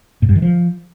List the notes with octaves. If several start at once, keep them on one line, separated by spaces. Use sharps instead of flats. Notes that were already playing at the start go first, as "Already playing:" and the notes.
A2
G2
D#3
F3